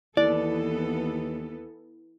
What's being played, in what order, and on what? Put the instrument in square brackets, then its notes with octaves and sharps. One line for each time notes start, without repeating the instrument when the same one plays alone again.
[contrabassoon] D#2 [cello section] E3 B3 A4 [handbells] E4 [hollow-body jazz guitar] D5